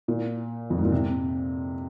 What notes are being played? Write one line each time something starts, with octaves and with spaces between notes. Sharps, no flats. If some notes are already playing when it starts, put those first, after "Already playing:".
A#2
F2
G#2
A#2
C3